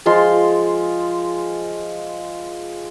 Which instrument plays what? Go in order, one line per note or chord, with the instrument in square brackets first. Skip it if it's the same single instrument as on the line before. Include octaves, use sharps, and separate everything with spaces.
[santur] F3 G#3 F4 C6